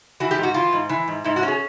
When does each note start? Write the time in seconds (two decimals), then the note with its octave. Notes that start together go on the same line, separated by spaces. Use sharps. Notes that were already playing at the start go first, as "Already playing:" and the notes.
0.20 E3 F#4
0.31 G4
0.38 G#2
0.43 F#4
0.54 E3 F4
0.73 G#2
0.89 E3
1.08 G#2
1.24 G#2 E4
1.36 F#4
1.43 C#4
1.48 G#4